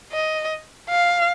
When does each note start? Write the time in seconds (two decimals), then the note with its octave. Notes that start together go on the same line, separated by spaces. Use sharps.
0.12 D#5
0.90 F5